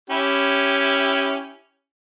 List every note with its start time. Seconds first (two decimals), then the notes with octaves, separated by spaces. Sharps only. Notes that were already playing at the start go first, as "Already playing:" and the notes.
0.10 C#4 E4 G4